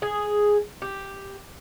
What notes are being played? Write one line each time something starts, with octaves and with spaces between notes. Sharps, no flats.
G#4
G4